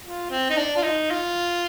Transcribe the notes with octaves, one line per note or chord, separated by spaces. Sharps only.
F4
C4
D#4
D4
F4
D#4
F4